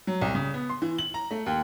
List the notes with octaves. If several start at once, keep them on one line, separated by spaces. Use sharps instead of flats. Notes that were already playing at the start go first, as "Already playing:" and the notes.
F#3
C2
C#3
B3
C6
E3
F#7
A#5
A3
D#2